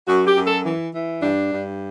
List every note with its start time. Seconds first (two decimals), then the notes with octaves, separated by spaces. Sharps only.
0.08 F#2 F#4
0.27 G4
0.37 F#2
0.46 A4
0.65 E3
0.94 E3
1.22 G2 D4
1.52 G2